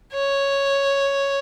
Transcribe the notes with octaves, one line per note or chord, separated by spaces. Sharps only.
C#5